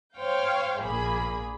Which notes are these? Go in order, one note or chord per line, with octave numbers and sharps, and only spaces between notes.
C5 C#5 F5 G5
A#1 A#2 A#3 G#4 B5